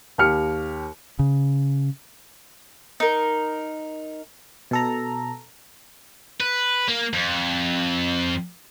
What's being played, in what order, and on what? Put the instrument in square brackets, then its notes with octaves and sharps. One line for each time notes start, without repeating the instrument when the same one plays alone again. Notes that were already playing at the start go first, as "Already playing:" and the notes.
[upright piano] D#2 G4 F6 C#7
[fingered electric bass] C#3
[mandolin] D#4 A#4
[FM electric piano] B2 A4 A#5
[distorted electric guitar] B4
A#3
F2